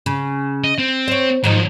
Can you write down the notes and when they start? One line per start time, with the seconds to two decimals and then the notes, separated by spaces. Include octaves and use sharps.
0.06 C#3
0.64 D#5
0.78 C4
1.08 C5 C#5
1.44 G#2 D#3 F3 F#3 D#4